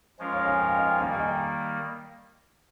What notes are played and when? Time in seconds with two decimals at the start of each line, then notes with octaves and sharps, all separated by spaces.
0.19 F3 G#3 C#4 F4 A#4
0.32 C#5 F5
0.46 F5 G#5
0.59 G5
0.68 F5
0.77 D#5 G5
0.91 G5
0.99 D#3 G3 A#3 F5 G#5
1.13 G#5
1.19 D#5 G5